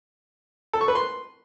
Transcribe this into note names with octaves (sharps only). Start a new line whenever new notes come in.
A4
C#6
B4
C6